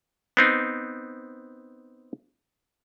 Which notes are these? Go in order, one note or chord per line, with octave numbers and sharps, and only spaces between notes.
B3 C4 D#4